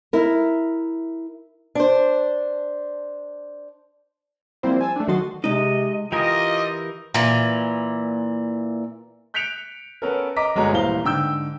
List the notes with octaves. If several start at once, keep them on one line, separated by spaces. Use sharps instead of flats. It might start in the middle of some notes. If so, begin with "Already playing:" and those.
E4 A#4
D4 C5
F3 G3 A#3 C4 E4 C5
G#5 A5 E6
A3 D4
D#3 F#3 F#4 C6 D#6 A6
C3 G#3 D#4 D#5
E3 F4 G4 A#4 D#5 G5 G#5
A#2 E3
F#6 G6 B6 C#7 D7 F7
B3 C#4 A4 A#4
D#5 A#5 D6 B6
G1 G#3 F#4 C#5 A#5
D#1 E3 C5 F5 A#5 G7
G#2 D3 G5 E6 G6